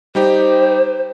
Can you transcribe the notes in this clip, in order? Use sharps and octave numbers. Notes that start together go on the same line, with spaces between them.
G3 D#4 G4 C5